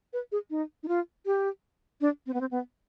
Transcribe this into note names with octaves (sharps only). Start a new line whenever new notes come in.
B4
G#4
D#4
D#4
F4
G4
D4
C4
B3
C4
B3